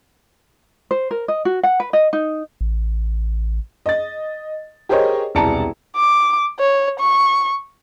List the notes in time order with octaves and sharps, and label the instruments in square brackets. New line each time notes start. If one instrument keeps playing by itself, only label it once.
[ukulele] C5
A#4
D#5
F#4
F#5
B4
D#5
D#4
[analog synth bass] A1
[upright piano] D#5 A6
G4 G#4 A#4 C5 C#5 D#5
E1 C2 D5 A5 A#5 C#7
[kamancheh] D6
C#5
C#6